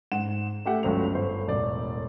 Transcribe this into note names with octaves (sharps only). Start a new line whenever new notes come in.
G#2 F#5 E7
A3 G4 F#5
G1 C#2 F#3 F7
G1 C5
E1 A1 D5